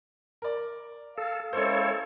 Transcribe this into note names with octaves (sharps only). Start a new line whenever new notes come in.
A#4 D5
A4 F5
G#3 A#3 C#4 E4 A4 C5 C#5